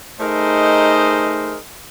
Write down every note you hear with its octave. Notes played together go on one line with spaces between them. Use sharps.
A3 D#4 G#4 A#4 C5 D#5